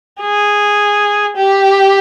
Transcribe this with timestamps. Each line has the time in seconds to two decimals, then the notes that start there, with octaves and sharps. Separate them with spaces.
0.21 G#4
1.37 G4